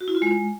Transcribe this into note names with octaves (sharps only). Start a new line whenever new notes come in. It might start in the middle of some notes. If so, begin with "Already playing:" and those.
F#4
E4
F4
G#3